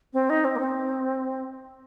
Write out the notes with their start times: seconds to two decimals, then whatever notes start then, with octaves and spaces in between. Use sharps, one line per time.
0.13 C4
0.30 D#4
0.44 C4
0.56 A#3
0.60 C4